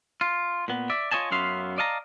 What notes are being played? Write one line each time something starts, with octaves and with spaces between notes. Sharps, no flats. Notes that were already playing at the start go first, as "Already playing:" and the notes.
F4
A#2 B3
D5 E5
F4 C#5 D#5 G#5 A5
F#2 B3 C#4 E5 F5 C6
D5 D#5 F5 A5 A#5